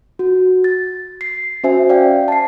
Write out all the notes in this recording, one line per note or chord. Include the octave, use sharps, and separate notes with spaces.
F#4
A6
C7
C#4 F#4 C5 E5 G#5
D5 F5 G5
A5 C7